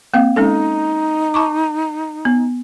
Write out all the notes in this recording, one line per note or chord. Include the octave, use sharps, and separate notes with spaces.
A#3 C4 F5
G#3 C#4 D#4 A4
A5 C#6 D6
B3